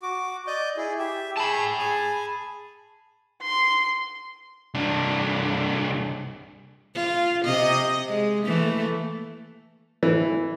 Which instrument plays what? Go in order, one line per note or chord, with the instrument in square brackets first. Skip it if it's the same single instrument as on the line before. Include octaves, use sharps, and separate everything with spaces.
[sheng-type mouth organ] F#4 D6
D5 D#5 G6
E4 G#4
G4 E5
[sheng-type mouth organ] G#4 E6 [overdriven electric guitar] A5 B5
[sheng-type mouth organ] G#4 G#5
[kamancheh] C6
[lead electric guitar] C2 D4
[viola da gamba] F4
C3 D#5
G#3
E3 A3 A#3
[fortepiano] E3